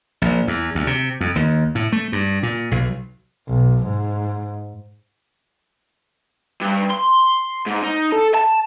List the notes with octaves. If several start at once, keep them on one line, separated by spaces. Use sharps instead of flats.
A#1
E2
D2
C3
F2
D#2
A2
A3
G2
A#2
B1
B1
G#2
G2
C6
G#2
D#4
A4
A5